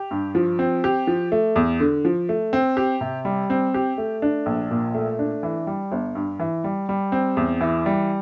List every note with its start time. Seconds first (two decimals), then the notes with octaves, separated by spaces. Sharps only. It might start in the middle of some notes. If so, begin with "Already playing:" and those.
Already playing: G4
0.11 G2
0.35 F3
0.59 C4
0.84 G4
1.07 F3
1.32 A3
1.56 E2
1.80 D3
2.05 F3
2.29 A3
2.53 C4
2.77 G4
3.01 C3
3.25 G3
3.50 C4
3.74 G4
3.98 A3
4.22 D4
4.46 A#1
4.71 A#2
4.94 A3
5.19 D4
5.43 E3
5.67 G3
5.92 G1
6.15 G2
6.39 E3
6.64 G3
6.89 G3
7.12 C4
7.37 E2
7.61 E3
7.86 G3